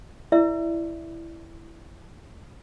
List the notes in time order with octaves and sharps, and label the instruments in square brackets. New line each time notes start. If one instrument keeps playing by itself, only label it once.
[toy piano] E4 A#4 D5 E5